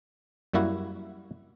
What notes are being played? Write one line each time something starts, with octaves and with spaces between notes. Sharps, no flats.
F#2 G3 A#3 E4 F#4